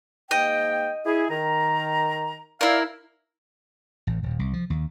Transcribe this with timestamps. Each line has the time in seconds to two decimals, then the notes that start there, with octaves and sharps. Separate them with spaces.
0.31 G#2 A#3 D#5 G5
1.05 E4 G#4
1.29 D#3 A#5
2.61 E4 A#4 D5 F5
4.07 A1
4.23 D#1
4.39 C2
4.53 F3
4.70 D#2